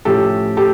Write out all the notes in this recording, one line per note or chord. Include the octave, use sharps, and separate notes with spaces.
A2 F3 A3 C#4 G4 A4
G4 A4